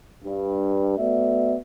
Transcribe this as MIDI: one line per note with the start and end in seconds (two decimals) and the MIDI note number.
0.24 0.95 43
0.97 1.57 57
0.97 1.57 59
0.97 1.57 66
0.97 1.57 74
0.97 1.57 76